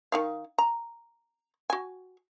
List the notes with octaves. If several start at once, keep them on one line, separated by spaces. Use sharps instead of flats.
D#3 D#4 F5
A#5
F#4 G#5